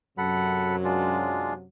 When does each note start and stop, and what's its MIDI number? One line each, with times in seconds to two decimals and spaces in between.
0.18 1.66 42
0.18 1.66 48
0.18 1.66 54
0.18 0.76 69
0.18 0.76 78
0.18 0.76 83
0.84 1.53 56
0.84 1.53 62
0.84 1.53 65